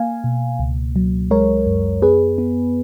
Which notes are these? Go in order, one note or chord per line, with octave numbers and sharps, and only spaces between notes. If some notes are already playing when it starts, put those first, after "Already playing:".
Already playing: A#3 F5 G#5
B2
C#2
F#3
G#3 A#4 C#5
F#2
B3 G#4 B4
B3